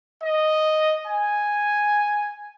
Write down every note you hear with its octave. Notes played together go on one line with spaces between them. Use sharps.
D#5
G#5